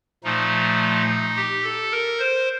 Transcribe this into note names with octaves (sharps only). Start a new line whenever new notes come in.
A#2 F3 A3 D#4
G4
A4
A#4
C5